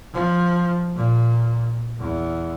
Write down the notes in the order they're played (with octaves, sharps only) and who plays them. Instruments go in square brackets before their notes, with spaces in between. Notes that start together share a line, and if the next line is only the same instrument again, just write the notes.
[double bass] F3
A#2
E2